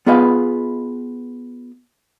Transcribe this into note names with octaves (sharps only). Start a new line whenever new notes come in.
B3 F4 G#4 B4 D#5 F5